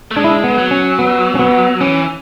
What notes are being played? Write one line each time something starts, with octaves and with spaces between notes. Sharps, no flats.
A3
G#3 D4
E4
D4
B3
F#3
C#4
B3
C#4
B3
E3 C#4